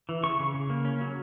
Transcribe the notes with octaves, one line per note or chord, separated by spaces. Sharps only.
E3
C#3 C#6
C#3
C#3
A#3
C#4
F#3